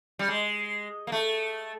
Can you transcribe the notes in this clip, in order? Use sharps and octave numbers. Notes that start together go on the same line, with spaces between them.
G3
G#3
A#3
A3